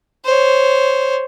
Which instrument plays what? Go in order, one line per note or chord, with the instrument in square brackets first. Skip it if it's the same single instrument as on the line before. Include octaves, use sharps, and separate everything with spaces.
[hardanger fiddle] C5 C#5